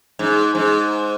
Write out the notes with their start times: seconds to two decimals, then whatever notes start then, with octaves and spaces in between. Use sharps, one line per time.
0.19 G#2
0.55 G#2